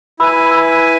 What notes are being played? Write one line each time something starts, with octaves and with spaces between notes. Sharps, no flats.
E4 B4 G#5 B5 E6
B5 E6